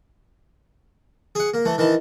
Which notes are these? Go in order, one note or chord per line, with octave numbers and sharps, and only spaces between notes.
G#4 F#5
A#3
E3 A3
D#3 E3 A5